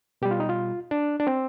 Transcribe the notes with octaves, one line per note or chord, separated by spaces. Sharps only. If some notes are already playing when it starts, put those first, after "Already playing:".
B2 G3 G4
F4
D#4
F4
D4
D4
C4